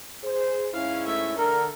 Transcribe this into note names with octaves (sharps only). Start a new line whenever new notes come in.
G#4 C5
G#2 C#4 E4 F5
A3 E5
D3 A4 A#4